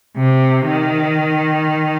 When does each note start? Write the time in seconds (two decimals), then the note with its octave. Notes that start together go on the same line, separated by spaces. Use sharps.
0.17 C3
0.67 D#3